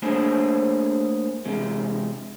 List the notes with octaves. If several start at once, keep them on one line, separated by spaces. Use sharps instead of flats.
A3 A#3 D4 G#4 C5 C#5
E2 C3 G#3